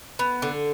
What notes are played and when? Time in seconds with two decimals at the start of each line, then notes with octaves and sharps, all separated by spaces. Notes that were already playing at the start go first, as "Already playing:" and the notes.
0.19 B3
0.42 D3